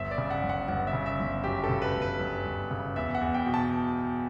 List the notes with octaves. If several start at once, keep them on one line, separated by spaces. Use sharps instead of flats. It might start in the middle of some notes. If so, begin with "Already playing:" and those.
Already playing: G1 E5
D5
C#3
F#5
G1
F#5
G1 F#5
E5
C#3
E5
G1
F#2 G4
A4
C#3
B4
G1
B4
G1
G1
C#3
E2 E5
F#5
E2
G5
B2
A5